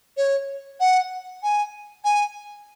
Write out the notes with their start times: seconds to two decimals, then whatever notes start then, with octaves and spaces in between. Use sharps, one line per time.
0.17 C#5
0.80 F#5
1.43 G#5
2.05 G#5